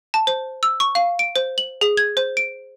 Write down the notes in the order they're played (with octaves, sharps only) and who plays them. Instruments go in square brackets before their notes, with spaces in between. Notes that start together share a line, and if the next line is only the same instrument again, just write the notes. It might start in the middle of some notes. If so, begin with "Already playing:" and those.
[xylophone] A5
C5
E6
C#6
F5
D7
C5
F#7
G#4
G#6
C5
D7